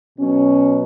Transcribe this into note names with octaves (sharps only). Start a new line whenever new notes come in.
B2 F#3 C#4